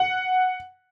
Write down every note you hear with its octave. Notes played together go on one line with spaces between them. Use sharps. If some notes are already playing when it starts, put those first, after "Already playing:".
Already playing: F#5